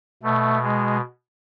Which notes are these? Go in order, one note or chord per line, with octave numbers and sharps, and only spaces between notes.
B2 A3
G#3